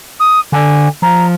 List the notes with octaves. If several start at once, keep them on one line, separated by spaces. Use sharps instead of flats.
D#6
D3 G#5
F3 A#5